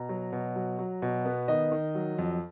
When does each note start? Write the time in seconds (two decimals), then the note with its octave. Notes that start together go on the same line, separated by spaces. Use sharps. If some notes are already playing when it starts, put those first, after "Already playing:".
Already playing: B2 A#5
0.09 F#3
0.33 B2
0.56 F#3
0.79 F#3
1.02 B2
1.25 B3
1.48 D#3 D#5
1.72 D#3
1.95 F#3
2.19 F2